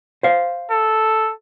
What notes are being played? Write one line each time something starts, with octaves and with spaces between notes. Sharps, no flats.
C5 F5
A4